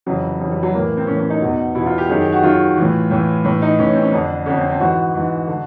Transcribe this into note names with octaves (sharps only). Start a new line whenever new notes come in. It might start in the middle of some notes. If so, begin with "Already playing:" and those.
F2 C#3 E3 F#3
F2 C#3 E3 G3
G3
F#3
A2 E3 A#3
C4
A2 E3 C#4
C#4
D#4
E2 B2
E2 B2 E4
F4
G4
F#2 D#3 G#4
G4
F#4
F#2 D#3 F4
A2 E3
A2 E3
A2 E3
D#4
A2 E3 C#4
C4
C#4
F2 D3 D4
F2 D3 C#4
C4
C4
G#2 E3 F#4
G#2 E3
D3